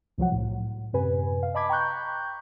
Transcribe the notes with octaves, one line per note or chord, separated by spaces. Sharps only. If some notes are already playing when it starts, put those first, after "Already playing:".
C2 F3 F#3 F#5
A2
F#2 C3 B4 G#5
F5
D#5 A5 B5 D6 G#6 B6
G5 A#5 B5 C#6 F#6 G6